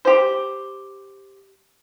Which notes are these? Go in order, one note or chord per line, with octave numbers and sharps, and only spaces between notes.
G4 C5